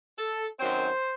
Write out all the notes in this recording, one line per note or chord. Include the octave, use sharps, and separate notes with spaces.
A4
F#2 D#3 F#3 C4 C5